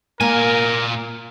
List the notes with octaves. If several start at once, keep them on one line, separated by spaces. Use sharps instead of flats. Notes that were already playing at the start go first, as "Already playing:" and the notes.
A#2 A#3 A#4 G#5